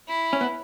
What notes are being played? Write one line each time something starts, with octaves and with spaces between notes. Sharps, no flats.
E4
C#4
B3